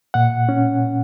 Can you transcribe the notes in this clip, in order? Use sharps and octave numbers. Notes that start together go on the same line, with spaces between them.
A#2 F#5
C#4